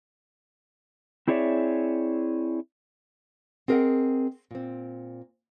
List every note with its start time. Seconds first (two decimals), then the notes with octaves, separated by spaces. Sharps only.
1.28 C4 E4 G#4 C#5 D5 E5
3.68 C4 G#4 A#4 C5 D#5 F#5
4.51 A#2 C4